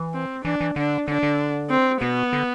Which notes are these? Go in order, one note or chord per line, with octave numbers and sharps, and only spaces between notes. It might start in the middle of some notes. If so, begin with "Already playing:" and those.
Already playing: E3
C4
E3 D4
E3
D3 D4
D3 D4
D3
C4
B2 B3
D3